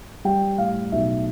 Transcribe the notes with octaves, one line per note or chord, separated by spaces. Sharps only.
G3 G5
A2 F5
B1 E5